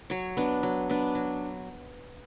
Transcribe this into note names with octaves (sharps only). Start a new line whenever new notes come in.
F#3 C#5
B3 D4
F#3
B3 D4
F#3